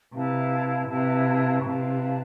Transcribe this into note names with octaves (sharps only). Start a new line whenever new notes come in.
C3 E4 B4 F5 A5
C3 E4 B4 F5 A5
C3 E4 B4 F5 A5